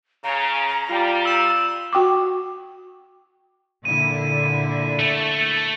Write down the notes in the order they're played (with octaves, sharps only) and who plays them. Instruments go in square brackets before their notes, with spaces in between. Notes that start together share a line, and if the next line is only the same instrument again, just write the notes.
[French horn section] C#3 [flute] A#5
[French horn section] G3 [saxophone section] F4
[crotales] E6 E7
[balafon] F#4 G5 C#6 D6
[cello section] A#2 D3 E4 [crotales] D#7
[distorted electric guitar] A3